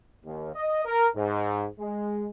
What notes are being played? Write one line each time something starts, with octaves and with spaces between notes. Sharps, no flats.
D#2
D#5
A#4
G#2
G#3